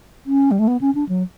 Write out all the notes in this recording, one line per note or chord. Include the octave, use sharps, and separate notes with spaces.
C#4
G3
A3
B3
C#4
D4
F#3